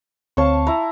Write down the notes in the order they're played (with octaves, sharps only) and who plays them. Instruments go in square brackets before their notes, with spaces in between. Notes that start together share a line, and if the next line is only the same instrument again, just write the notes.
[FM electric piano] D2 C4 C#5 [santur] F5 A5 C#6
[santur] E4 A#5